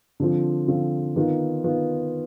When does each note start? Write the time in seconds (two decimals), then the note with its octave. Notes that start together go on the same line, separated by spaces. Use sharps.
0.20 D3 F3 C4 F4
0.68 D3 F3 C4 F4
1.16 D#3 B3 F4
1.64 D#3 B3 F4